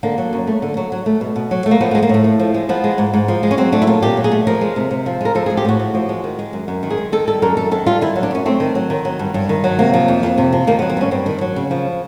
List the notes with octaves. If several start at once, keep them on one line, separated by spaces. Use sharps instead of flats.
D3 A#3
F#3
F#2
A3
D3
F#3
F#3
A3
B2
B2
F#3
A3
A#3
F3 B3
B3
G#3
A#3
A2 A3
A2
F3
G#3
F3 B3
G#3
G#2
G#2
F3
G#3
C#4
F#3 C4
A3 D4
E4
A#2 F4
A#2 G4
F#3
G#4
A3
F3 A#4
G#3
C3
C3
F3
G#3 A#4
F3 A4
G#4
G#3
G4
A2 F#4
A2
F3
G#3
D#3
G#3
F#2
F#2
D#3
G#4
G#3
D#3 A4
G3 A4
F#2 A#4
F#2 A4
D#3 A4
G3 F4
D#3 E4
F#3
D4
F#2 C#4
A3 C4
D#3
F#3
D#3
F#3
G2
G2
D#3
F#3
C3 A#3
F3
F2
F2
C3
F3
D#3 A#3
B3
F#3
C4
G2 C#4
G2 C4
D#3
F#3
C#3
F3